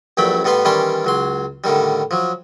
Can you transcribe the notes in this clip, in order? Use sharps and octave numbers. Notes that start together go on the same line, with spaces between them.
A#1 G2 F#3 A3 G5 B5
A2 G3 B3 B4 C6
D#3 E3 G3 C#4 D5 C6
C#2 F#3 C6
A2 D3 D#3 G3
F3 F#3